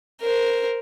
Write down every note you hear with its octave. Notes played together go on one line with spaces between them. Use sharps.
A#4 C5